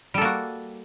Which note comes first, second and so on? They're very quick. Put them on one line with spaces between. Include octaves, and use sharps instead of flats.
G3 A4 A#3 F#4